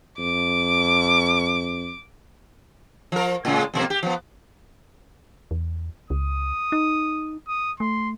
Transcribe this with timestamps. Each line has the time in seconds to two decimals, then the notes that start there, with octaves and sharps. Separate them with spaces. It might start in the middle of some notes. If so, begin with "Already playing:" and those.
0.19 F2 D6
3.12 F3 A#4
3.45 A2 C#3 G#3
3.74 F2 B2 A#3
3.90 G4
4.03 F3 B3
5.51 E2
6.10 C#2 D#6
6.72 D#4
7.48 D#6
7.80 A3 C6